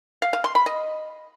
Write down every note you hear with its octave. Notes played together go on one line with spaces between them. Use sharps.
F5
F5
C6
B5
D#5